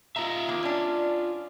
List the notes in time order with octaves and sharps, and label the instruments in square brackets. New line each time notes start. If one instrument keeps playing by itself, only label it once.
[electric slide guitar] F4 D#5 E5 [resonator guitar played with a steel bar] A#5
[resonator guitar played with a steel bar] D#3 A#3
C#4 D4